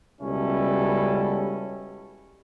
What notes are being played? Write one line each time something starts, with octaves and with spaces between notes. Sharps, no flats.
C#2 B2 G3 C#4 E4 A4